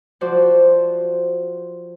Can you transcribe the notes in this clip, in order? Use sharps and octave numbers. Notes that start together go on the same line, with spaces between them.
F3 F#4 C5 D5